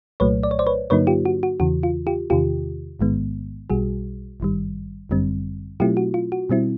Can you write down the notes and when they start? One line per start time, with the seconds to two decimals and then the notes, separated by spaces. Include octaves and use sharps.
0.20 C2 A#2 F#3 A3 B4 C#5
0.43 D5
0.51 C#5
0.59 C5 D5
0.67 B4 C#5
0.90 G2 D3 F#3 A#3 D#4 B4 C#5
1.07 F4 G4
1.25 F#4
1.43 F#4
1.60 E2 C#3 E3 F#4
1.83 F4
2.07 F4 G4
2.30 E2 C3 D#3 F4 G4
2.99 A1 G#2 D#3 G#3 B3
3.70 B1 B2 G3 F#4 G#4
4.40 G#1 G2 D#3 G3
5.09 G1 F#2 D3 G3 C4
5.80 B2 F#3 A3 C4 E4 F4 G4
5.97 F#4
6.14 F4
6.32 F#4
6.50 B2 G3 C4 E4